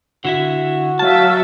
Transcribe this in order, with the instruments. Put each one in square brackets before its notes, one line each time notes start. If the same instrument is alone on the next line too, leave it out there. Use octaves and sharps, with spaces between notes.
[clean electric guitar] D3 E4 E5 [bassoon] F#4
[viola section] F#3 E5 [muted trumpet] F5 [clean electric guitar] A5